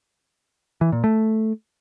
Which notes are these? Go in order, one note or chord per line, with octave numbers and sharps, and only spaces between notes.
E3
A#2
A3